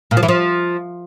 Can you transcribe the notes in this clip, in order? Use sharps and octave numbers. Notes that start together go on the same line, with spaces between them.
A#2
F3
E3
F3